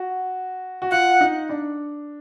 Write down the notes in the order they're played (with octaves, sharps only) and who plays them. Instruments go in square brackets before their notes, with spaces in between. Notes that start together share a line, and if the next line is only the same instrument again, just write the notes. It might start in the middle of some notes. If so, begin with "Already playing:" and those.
Already playing: [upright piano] F#4
F#4
[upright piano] F4 [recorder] F#5
[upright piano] D#4
D4